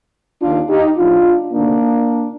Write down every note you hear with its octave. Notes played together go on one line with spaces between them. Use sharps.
D#2 D#3 D4 F4
D#4 G4
A2 F3 D4 F4
D2 C3 D#3 A#3 D4